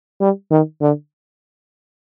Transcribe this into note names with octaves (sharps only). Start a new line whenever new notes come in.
G3
D#3
D3